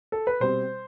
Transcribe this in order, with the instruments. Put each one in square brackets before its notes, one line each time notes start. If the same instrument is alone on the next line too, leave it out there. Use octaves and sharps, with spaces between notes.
[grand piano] A4
B4
B2 G3 C4 C5